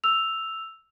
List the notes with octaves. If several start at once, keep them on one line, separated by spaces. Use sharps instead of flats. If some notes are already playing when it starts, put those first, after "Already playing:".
E6 F7